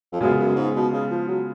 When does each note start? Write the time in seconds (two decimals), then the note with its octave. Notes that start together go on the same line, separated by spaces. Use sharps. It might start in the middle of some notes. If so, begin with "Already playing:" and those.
0.12 F2
0.21 F#2 C#3 G#3 B3 F4 G#4
0.39 F#2
0.56 G#2
0.75 B2
0.93 C#3
1.11 F3
1.28 F#3